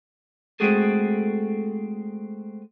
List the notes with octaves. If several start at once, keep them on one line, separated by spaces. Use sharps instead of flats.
G#3 A3 C4 F#4 G#4 A4